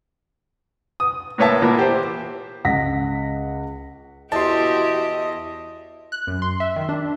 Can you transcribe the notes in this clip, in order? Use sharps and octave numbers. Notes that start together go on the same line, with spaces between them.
D#6
A2 A#3 B4 C#5 E5 A5
A#2 E3 A#3 B3
G4 C5
C#2 F#5 A#6 B6
E2 E4 F#4 G4 D#5 A5 C6
F#6
F#2
C6
E5
D#3
D4